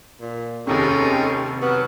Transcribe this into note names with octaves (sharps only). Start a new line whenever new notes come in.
A#2
F1 D#2 C3 G#3 C#4 D#4 A4 G5
F#3 B3 B4 C#6 F6